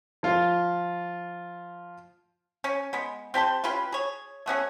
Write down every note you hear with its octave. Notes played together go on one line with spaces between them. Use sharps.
F3 F4
C#4
G#3 B3
C4 G4 A5 C6
C#4 F4 G4 B4
G#4 C#5
A3 B3 C#4 G#4